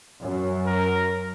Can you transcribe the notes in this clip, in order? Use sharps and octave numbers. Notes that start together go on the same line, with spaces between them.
F#2
A#4